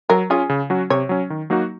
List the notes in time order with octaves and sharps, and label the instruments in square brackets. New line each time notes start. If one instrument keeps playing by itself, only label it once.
[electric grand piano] F#3 [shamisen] A#4
[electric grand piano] C#4 F4 [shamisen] G#4
[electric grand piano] C#3
F#3 C#4 F#4
[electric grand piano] C3 [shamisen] C#5
[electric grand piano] F#3 C#4
D#3
F#3 A#3 D#4 F#4